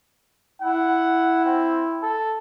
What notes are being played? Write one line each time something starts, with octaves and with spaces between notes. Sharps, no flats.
E4 F#5
C4
A4